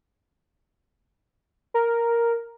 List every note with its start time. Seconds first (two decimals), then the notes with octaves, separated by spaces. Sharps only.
1.74 A#4